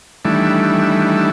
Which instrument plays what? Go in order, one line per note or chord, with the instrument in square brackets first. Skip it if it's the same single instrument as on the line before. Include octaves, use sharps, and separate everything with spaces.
[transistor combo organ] D#3 E3 G3 A3 D4 E4